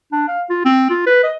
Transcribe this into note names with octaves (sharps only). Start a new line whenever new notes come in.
D4
F5
F4
C4
F4
B4
D#5